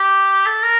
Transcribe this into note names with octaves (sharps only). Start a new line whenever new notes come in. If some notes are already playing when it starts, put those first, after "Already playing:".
Already playing: G4
A4
A#4